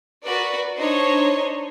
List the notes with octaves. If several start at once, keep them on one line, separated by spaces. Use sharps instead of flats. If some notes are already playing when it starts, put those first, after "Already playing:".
F#4 A#4 B4 D5
D4 D#4 C5 C#5 D#5